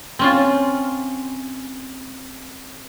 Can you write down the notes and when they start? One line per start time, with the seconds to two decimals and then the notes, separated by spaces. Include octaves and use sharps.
0.19 C4 C#4 F4